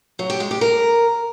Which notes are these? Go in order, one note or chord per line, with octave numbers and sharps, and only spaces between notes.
F#3
G4
G#3
G4
A#4